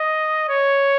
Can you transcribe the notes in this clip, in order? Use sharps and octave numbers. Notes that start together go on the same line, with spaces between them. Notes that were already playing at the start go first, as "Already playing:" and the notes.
Already playing: D#5
C#5